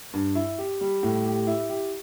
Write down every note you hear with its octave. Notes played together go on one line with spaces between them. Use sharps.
G2
E4
G4
G3
A2
G4
E4
G4